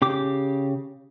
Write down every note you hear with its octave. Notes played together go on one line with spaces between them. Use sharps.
C#3 G4 D6